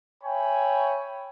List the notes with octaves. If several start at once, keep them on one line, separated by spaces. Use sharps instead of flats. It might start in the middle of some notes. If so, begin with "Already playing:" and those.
C#5 E5 G5 G#5 B5